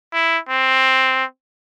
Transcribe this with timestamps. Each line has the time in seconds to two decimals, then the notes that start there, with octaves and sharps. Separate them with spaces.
0.13 E4
0.49 C4